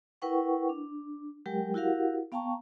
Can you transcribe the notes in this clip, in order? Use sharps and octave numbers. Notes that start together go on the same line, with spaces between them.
E4 A#4 B4 F#5 G5 C#6
D4
F#3 G#3 G4 A#4 G5
E4 F#4 G4 A#4 F5 F#5
B3 F5 G5 A5 A#5 C#6